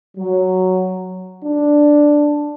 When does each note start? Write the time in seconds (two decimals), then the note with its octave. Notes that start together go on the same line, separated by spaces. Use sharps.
0.18 F#3
1.44 D4